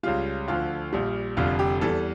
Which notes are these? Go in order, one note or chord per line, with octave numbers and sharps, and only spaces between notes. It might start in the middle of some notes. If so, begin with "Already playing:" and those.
C#2 C#3 G3 F4
D2 D3 F3 F4
A#1 A#2 G3
F1 F2 D3 G3 F4
G4
E2 E3 G3 A4